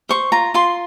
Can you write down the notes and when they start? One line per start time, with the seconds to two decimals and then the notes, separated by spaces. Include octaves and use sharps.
0.09 C5 C#6
0.32 F4 A#5
0.54 F4 C6